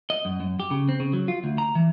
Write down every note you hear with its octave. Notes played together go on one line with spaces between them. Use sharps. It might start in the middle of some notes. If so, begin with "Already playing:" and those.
D#5
F#2
F#2
G4
C#3
C4
C#3
F#3
F4
D2
A#5
E3